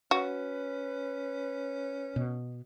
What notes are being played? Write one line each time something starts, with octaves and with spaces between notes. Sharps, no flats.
C#4 F#4 B4
B2